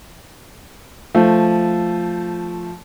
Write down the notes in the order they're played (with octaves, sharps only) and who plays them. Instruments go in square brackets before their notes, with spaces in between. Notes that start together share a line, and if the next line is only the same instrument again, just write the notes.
[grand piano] F3 [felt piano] A3